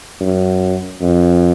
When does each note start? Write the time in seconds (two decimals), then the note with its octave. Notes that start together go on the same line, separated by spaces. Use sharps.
0.21 F#2
1.01 F2